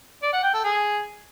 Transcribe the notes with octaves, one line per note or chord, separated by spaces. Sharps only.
D5
F#5
G5
A4
G#4